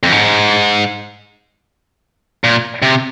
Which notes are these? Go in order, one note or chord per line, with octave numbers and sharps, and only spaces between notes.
F2
G#2
A#2
C3